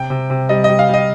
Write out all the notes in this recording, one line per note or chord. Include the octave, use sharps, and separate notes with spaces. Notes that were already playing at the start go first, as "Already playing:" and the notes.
Already playing: C3 G5
C3
C3
G3 D#5
D#5
G3
F5
G3 D#5